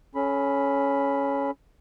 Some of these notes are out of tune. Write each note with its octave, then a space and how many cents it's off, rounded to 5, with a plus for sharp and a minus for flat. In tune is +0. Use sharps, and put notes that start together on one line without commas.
C#4 +5 A4 -35 B5 +0